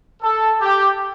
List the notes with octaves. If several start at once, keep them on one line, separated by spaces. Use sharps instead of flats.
A4
G4